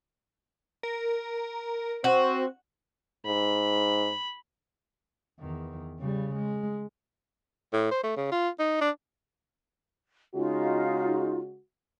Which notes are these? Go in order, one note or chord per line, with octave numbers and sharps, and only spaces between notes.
A#4
C4 F#4 C5
G#2 B5
E2 D#3
C#3 G3
G#3
A2
C5
A3
C#3
F4
D#4
D4
C#3 G#3 D#4 F4 F#4